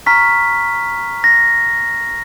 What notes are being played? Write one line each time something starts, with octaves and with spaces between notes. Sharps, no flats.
A#5 C#6 F6 B6
A#6